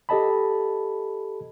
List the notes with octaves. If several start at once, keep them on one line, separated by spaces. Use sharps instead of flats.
G4 A4 D#5 A5 B5